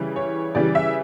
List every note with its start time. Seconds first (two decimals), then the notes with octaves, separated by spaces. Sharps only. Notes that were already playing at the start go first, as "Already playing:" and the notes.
Already playing: C#3 E3 G3
0.16 C#5
0.55 C#3 E3 G3 D5
0.75 E5